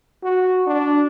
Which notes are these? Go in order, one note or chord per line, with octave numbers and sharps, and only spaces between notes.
F#4
D4